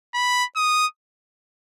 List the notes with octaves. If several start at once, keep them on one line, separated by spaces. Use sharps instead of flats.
B5
D#6